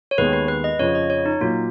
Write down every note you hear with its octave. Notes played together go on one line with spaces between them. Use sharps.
C#5
D#2 D#3 G#3 B3 B4
B4
B4
D#5
F2 C#3 F3 C#5
D#5
C#5
D#4
A#2 F#3 A#3 F4